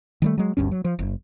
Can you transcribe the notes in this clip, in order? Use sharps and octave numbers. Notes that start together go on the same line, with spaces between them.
D#3 G3 A3
F#3 G#3
G1 D2 G2 C#4
F#3
F3
F#1